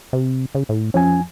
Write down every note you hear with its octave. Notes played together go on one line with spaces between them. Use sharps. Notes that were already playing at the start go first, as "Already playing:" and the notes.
C3
C#3
A2
F2 F3 C#4 G#5